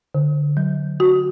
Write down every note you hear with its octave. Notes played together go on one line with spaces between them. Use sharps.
D3
F#3
F#4